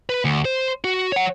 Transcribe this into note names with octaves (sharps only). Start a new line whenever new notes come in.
B4
D2
C5
F#4
C#5 F#5